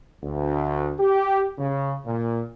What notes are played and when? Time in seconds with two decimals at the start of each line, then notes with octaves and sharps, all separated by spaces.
0.22 D2
0.99 G4
1.57 C#3
2.05 A#2